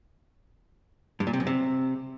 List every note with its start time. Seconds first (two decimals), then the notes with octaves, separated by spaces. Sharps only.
1.20 G2
1.27 A#2
1.33 C3
1.40 F#2
1.47 C3